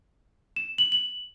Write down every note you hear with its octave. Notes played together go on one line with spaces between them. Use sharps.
E7
F#7
F#7